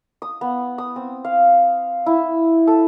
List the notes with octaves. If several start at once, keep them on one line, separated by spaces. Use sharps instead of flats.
D#6
B3
D#6
C4
F5
E4
A4